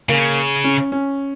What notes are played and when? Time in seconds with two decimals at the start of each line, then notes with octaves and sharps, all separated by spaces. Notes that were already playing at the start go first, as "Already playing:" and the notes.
0.09 C#3 A#3
0.64 C#4
0.92 C#4